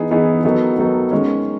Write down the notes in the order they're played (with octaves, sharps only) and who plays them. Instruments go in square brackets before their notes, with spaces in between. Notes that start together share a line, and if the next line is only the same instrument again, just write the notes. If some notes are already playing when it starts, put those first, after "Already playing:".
Already playing: [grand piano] E3 B3 D#4 G#4
E3 B3 D#4 G#4
D#3 F#3 B3 D#4 A4
D#3 F#3 B3 D#4 A4
D#3 G#3 C#4